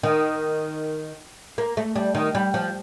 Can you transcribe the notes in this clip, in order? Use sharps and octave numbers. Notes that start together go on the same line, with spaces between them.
D#3
A#3
A3
G3
D#3
G3
F3